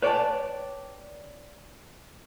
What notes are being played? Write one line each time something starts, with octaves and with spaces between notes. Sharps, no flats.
B4 C#5 D5 F#5 G5 A5